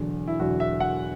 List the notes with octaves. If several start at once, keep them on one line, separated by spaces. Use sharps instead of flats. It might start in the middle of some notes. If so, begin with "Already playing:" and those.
Already playing: E1 E2 D3 F#3
E4
E1 E2 D3 F#3 F#4
E5
F#5